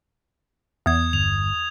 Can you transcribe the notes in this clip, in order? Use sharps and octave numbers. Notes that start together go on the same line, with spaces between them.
E2 D#6 G#6
G1 F7